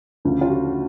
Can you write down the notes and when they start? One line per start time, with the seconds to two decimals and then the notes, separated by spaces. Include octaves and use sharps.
0.25 D2 C#3 F3
0.41 F4
0.49 F#4